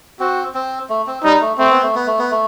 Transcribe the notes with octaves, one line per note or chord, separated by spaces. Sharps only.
C4 F#4
C4
A3
C4
G3 D#4
A3
A3 C4
B3
A3
B3
A3
B3
A3